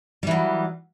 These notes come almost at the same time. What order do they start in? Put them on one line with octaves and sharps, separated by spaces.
G3 E3 F#3